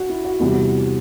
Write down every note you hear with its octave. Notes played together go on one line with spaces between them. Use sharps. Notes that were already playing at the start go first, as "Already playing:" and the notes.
Already playing: F#4
E4
F#4
E2 C3 G3